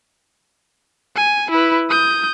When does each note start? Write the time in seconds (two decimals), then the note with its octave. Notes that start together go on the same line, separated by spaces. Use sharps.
1.16 G#5
1.51 E4 B4
1.90 D#6 G6